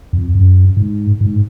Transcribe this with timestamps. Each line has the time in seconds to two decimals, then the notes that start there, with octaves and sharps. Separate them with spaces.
0.13 F2
0.35 F#2
0.77 G#2
1.21 G#2